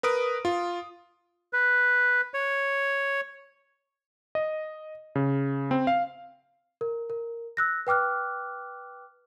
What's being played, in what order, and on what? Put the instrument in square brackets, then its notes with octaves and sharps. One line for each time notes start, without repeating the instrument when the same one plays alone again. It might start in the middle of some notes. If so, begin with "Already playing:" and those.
[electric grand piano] A#4 B4 D#6 D7
F4
[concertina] B4
C#5
[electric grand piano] D#5
C#3
C4
F5
[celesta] A#4
A#4
E6 F#6 A#6
B4 G5 D6 F6 F#6